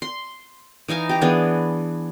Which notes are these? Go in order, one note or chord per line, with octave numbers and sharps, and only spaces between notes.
C6
E3 D#4 F5 G#5
G4 A#5
E3 B3 D4 G#4